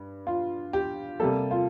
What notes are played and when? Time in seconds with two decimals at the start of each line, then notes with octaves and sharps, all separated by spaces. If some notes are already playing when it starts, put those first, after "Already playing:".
Already playing: G2
0.27 F4
0.73 G4
1.20 C3 G3 A#3 A4
1.51 F4